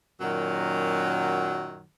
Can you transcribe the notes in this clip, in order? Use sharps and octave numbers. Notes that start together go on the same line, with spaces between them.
F#2 A#2 D#3 F#3